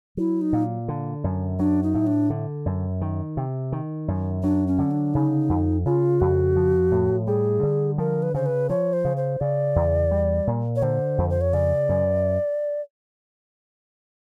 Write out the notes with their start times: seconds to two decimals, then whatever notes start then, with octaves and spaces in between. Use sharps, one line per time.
0.17 F#3 E4
0.41 D#4
0.53 A#2
0.88 D3
1.24 F#2
1.59 F#3 D4
1.83 D#4
1.95 A2
2.07 D4
2.30 D3
2.66 F#2
3.01 D#3
3.37 C3
3.72 D#3
4.08 F#2
4.43 F#3 D4
4.67 C#4
4.79 D3
4.91 D4
5.14 C#3 D#4
5.49 F2
5.85 C#3 F4
6.20 F2 F#4
6.56 F3
6.92 A2
7.27 G3 G#4
7.63 D3
7.98 F3 A#4
8.23 B4
8.34 C#3 C5
8.46 B4
8.69 F3 C#5
8.93 C5
9.05 C#3
9.17 C5
9.40 C#3 D5
9.76 E2
10.11 G3
10.47 A#2
10.76 C#5
10.82 D3 C5
11.18 F2
11.30 C5
11.41 C#5
11.53 C#3 D5
11.89 F#2